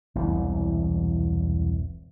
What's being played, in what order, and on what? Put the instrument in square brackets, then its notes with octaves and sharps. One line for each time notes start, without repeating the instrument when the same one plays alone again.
[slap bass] E1 C2 E3